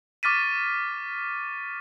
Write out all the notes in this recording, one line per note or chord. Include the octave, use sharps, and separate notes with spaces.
C#6 D6 F6 A6 B6 D#7